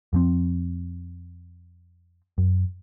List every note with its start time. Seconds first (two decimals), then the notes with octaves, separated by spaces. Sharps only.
0.13 F2 F3 C4
2.38 F#2